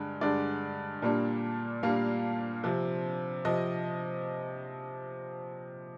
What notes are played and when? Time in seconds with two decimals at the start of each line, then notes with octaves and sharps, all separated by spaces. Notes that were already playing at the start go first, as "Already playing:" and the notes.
Already playing: G2 D3 G#3
0.21 G2 D3 G#3 D5
1.02 A#2 G3 A#3 D4
1.83 A#2 G3 A#3 D4 F5
2.64 C3 F3 C4
3.45 C3 F3 C4 D#5